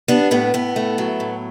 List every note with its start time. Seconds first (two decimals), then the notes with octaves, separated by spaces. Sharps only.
0.08 G3 B3 D4
0.31 A2 B3 D4
0.54 A2 B3
0.76 A3
0.98 F#3
1.20 A2